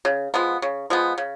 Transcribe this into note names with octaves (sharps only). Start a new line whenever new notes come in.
C#3
F3 G#3 B3
C#3
F3 G#3 B3
C#3